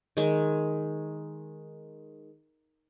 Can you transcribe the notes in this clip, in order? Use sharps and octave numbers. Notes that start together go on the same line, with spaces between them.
D#3 G#3